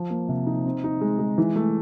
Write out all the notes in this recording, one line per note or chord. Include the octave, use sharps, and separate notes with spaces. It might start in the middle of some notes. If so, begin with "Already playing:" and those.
Already playing: F3
A#3
C3
D#4
C4
D#4
G#3
G#3
E3
A3